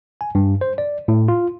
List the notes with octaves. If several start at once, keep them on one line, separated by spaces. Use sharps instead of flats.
G#5
G2
C5
D5
A2
F4